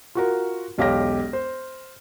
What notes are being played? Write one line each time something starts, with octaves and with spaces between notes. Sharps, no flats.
F4 F#4 A#4
E1 B1 G4 F5 F6 A#6
C5